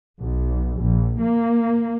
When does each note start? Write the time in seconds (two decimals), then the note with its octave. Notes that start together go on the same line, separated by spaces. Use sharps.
0.19 B1
0.78 A#1
1.18 A#3